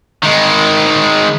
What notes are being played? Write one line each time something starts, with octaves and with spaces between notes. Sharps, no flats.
D#3 G#3